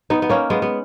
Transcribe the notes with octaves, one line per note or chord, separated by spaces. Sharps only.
B3 D#4
B3
A#3 C#4
G#3 B3
B3